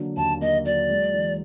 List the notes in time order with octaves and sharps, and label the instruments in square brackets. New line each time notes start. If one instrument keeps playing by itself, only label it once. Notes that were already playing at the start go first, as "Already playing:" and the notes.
Already playing: [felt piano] D3 F#3 A#3
[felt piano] D#2 [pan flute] A5
[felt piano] A#3 [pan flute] D#5
[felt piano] F#3 [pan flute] D5
[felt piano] G#3
E3